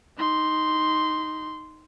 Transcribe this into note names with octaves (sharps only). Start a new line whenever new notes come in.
D#4 C6